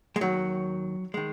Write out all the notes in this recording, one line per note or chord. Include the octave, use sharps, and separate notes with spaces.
G#3
D#2 D#3 F#3
D#3 G#3